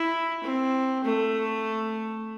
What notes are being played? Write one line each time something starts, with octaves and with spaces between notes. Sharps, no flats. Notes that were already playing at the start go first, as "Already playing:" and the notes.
Already playing: E4
C4
A3